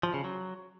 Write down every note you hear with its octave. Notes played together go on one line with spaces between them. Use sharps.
F3
C#3
F#3